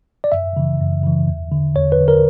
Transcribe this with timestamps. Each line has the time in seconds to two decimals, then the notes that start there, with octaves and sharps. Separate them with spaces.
0.24 D5
0.32 F#2 E5
0.57 C#3 E3
0.81 F#2
1.04 C#3 E3
1.28 E2
1.52 D3
1.76 E2 C#5
1.92 B4
2.00 D3
2.08 A#4